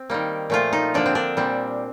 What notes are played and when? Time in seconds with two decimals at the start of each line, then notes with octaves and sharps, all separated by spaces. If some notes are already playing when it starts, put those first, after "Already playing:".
Already playing: C4
0.10 D#3 G3 A#3
0.50 A#2 F3 A3 F4
0.73 D#4
0.94 D3 F3 A#3 D4
1.06 C4
1.15 D4
1.37 A#2 G3 C4